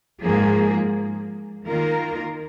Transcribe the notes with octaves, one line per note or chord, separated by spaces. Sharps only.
G#2 F3 A#3 G#4
D#3 A#3 F4 A#4